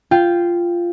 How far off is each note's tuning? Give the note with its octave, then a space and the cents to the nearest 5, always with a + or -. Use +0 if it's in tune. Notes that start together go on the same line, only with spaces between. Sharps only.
F4 -10 G5 +0